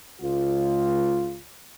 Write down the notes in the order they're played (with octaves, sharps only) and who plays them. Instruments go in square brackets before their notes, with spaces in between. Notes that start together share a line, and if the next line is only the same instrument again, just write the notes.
[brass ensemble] C#2 F4